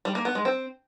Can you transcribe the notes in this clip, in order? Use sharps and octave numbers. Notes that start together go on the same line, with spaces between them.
G3
A#3
B3
G#3
C4